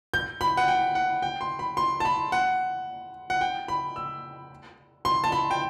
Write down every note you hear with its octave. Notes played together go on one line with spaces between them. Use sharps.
G6
B5
F#5
G5
F#5
G5
C6
B5
C6
A5
B5
F#5
F#5
G5
B5
E6
C6
A5
B5
G5